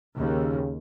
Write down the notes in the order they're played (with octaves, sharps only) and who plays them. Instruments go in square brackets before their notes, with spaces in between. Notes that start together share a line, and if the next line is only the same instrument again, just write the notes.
[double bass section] D#2 [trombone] C#3